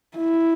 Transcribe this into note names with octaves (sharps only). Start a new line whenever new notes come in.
E4